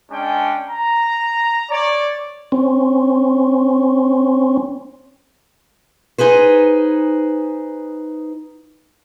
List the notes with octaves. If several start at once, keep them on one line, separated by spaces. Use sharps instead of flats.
G#3 C#4 D4 G5
A#5
C#5 D5
C4 C#4
D#4 G#4 B4 C5